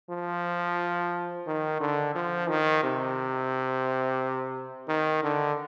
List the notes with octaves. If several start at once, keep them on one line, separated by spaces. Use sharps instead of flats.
F3
D#3
D3
F3
D#3
C3
D#3
D3